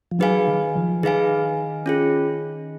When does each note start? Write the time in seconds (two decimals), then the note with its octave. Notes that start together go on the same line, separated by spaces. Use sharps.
0.11 F3
0.19 F#3 D#4 G#4 B4 F5 G#5
0.47 D#3
0.75 F3
1.03 D#3 D#4 G#4 B4 F5 G#5
1.86 C#4 F4 G#4